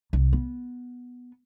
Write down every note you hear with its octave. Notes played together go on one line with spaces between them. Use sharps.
C2
B3